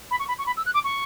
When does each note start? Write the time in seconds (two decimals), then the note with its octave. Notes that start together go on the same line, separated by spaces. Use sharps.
0.11 B5
0.19 C#6
0.28 B5
0.38 C#6
0.46 B5
0.57 E6
0.65 F#6
0.74 D6
0.84 C#6